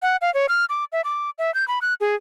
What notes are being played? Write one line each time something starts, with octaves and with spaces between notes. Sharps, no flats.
F#5
F5
C#5
F6
D6
E5
D6
E5
G6
B5
F#6
G#4